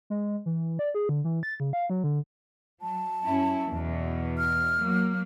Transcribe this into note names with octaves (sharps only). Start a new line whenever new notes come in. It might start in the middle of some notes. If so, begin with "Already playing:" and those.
G#3
E3
D5
G#4
D3
E3
A6
C#3
F5
F#3
D3
F#3 A5
F#2 C#4 E4
E2 B2
F6
F#3 A#3